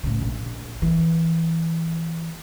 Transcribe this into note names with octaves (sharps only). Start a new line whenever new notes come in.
A2 C#3
A#1
E3